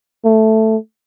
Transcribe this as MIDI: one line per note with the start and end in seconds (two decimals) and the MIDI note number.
0.25 0.76 57